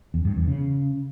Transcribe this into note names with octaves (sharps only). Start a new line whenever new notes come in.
E2
G2
E2
C#3